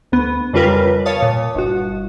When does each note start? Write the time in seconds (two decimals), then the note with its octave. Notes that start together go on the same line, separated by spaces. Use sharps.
0.12 D2 B3
0.53 F2 C#3 G3 F4 A#4 B4
1.06 C#5 F5 A5 D#6
1.22 A#2
1.55 G1 F#4